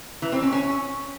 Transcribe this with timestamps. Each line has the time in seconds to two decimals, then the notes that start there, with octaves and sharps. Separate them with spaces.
0.22 E3
0.32 C4
0.42 C#4
0.52 C#4